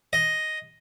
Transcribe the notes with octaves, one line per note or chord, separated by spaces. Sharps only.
D#5